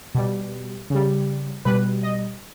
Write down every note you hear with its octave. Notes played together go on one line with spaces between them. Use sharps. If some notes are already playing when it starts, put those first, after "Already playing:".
B2 G3
C#3 G3
B2 G3 B4
D#5